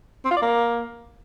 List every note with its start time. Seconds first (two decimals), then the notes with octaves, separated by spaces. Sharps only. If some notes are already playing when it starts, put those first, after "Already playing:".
0.25 C4
0.31 F4
0.36 D5
0.42 A#3